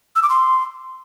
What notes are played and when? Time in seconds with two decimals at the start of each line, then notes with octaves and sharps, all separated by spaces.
0.16 E6
0.23 D6
0.30 C6